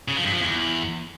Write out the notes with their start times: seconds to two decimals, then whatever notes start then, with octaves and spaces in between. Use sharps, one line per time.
0.08 C#3
0.16 F3
0.24 G2
0.33 F3
0.41 E2